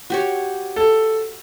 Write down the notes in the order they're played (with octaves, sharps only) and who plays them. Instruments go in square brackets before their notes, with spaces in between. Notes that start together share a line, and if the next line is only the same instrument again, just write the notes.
[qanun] F#4 G4 C#5
[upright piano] A4